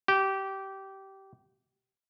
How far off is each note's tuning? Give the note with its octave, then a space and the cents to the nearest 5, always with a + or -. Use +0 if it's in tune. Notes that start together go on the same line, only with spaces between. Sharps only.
G4 -20